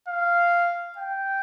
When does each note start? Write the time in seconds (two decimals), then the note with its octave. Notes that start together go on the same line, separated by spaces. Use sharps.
0.08 F5
0.98 G5